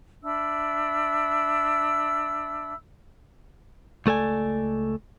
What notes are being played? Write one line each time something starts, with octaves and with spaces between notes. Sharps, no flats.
D4 E5 B5 E6
C#2 A3 A4 D5 G#5